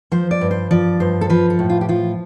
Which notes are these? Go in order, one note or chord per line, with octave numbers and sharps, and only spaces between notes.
F3 C5
D5
G2
C5
F3 D5
G2 C5
A4
F3 B4
A4
A2
F4
G4
F3 F4